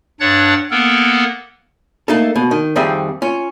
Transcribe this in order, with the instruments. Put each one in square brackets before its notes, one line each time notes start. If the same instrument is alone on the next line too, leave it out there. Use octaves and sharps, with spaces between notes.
[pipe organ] G2 D4 C#5 F#5 F#6 A6
A#3 B3 A4 A#4
[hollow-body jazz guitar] A3 A#3 D#4 A4
B2
D#3
F2 D#3 G3 C4 G#4 E5
C#4 F4